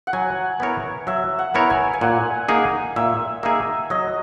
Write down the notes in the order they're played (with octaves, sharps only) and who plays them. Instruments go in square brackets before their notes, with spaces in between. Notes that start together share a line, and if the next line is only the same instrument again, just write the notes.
[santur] F#5
[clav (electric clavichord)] F#3 [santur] G#5
[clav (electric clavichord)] B3 E4 A#4 C#5
[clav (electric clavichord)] F#3 [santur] E5
[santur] F#5
[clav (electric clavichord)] B3 E4 A#4 C#5
[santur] G#5
G#5
[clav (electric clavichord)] A#2 [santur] F#5
[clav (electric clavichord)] A#3 D#4 G#4
[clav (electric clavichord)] A#2 [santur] E5
[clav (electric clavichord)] A#3 D#4 G#4 [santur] E5
[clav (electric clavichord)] F#3 [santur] D#5